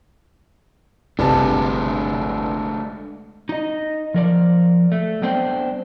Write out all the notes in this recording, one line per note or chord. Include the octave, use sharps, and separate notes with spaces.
G1 C3 G#3 A3 D4 A5
D#4 D#5
F3 A#4 D5
A3
G3 B3 C4 D4 C5 G5